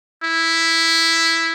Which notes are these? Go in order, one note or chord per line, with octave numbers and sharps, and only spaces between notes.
E4